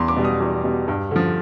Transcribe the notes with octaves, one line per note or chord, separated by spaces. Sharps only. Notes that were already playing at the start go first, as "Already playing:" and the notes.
Already playing: E2 C6
D6
B2 G3
D#6
E2
B2 G3
G2
D3 F3